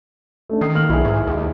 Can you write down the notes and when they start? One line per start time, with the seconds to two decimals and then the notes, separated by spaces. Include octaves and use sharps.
0.49 A3 C#4 D4
0.61 D#3 D#6 C7
0.74 A#3 F6 F#7
0.89 B1 E4 G#4
1.05 G#2
1.27 D#2